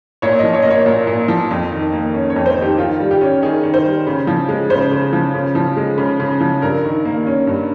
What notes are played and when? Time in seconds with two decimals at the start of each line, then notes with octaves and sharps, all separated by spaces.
0.22 A#2 C#5
0.39 F3 D#5
0.54 C#5
0.62 D#5
0.65 A#3
0.70 C#5
0.86 A#2
1.07 A#2
1.28 F3
1.51 F2
1.71 D#3
1.92 A#3
2.14 C#4
2.30 C#5
2.36 F2
2.46 C5
2.58 D#3 G4
2.78 D#3 F4
3.00 G3
3.11 G4
3.21 C#4
3.42 D#3 G#4
3.63 D#3
3.74 C5
3.85 G3
4.07 C#3
4.27 F3
4.49 G#3
4.70 C#3 C5
4.92 C#3
5.13 F3
5.34 C#3
5.55 F3
5.77 G#3
5.98 C#3
6.20 C#3
6.41 F3
6.62 G2 A#4
6.84 D#3
7.05 A#3
7.27 C#4
7.47 G2